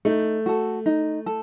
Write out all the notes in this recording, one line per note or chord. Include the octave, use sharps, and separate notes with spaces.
A3 D#4
F#4 A4
D#4
A4